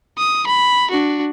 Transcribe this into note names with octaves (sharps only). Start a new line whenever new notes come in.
D#6
B5
D4 F#4